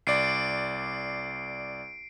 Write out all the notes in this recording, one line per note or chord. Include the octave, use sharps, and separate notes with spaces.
C2 D5 C7 D7